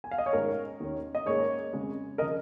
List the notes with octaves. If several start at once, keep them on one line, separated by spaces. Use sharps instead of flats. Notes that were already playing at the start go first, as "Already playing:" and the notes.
G#5
F5
D#5
C#5
G#2 D#3 G#3 C#4 A#4
D#2 D#3 A#3 C#4
D#5
G#2 D#3 A#3 C#4 G#4 C#5
F2 C#3 G#3
C#3 F3 A#4 D#5